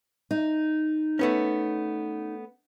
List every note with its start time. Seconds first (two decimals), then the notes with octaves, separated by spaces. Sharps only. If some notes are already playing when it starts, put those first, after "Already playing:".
0.31 D#4
1.19 A3 B3 C#4